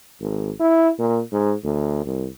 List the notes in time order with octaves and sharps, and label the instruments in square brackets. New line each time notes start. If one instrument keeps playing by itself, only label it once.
[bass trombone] G#1
E4
A#2
G#2
D2
C2